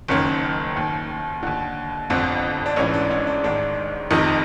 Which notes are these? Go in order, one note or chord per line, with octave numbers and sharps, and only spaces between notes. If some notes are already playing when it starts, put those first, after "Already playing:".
F#1 F#2 D#3 C#4
D#2 D#3
D#2 D3
G1 F2 D3 C4
D4
A1 G#2 E3 C#4
D4
C#4
D4
A1 G#2 D#3 D4
F1 F2 C3 D#3 D#4